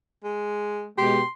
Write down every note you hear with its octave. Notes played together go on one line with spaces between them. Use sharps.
G#3
B2 G#3 G4 C6